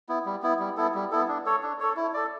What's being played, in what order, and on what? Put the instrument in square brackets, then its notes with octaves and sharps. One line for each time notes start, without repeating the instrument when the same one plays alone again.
[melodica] B3 E4
G3
B3 E4
G3
B3 E4 A4
G3
B3 E4 A4
D4
A4 C#5
D4
A4 C#5
E4
A4 D5